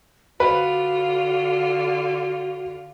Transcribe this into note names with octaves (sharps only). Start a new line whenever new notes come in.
D3 F4 F#4 B4